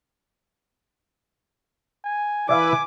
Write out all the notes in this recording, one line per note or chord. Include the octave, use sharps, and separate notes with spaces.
G#5
E3 E4 B4 D5 E5 F5 G#5 D6